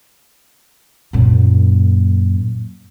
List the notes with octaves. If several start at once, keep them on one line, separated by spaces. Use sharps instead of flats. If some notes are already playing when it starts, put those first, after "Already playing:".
F#2 A#2